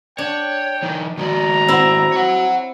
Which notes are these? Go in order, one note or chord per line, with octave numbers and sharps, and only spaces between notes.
D4 C#5 G5
E3 D#4
D#3 G#3 F#4 D5 A#5
C4 E4
C#5 F#5